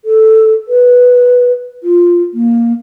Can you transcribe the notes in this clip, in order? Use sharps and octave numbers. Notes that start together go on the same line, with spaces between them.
A4
B4
F4
A#3